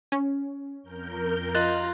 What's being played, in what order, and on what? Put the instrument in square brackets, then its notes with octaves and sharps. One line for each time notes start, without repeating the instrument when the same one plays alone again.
[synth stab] C#4
[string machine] F2 A#4 G6
[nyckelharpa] F4 [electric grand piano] D#5 F#6 A6 [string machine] A#5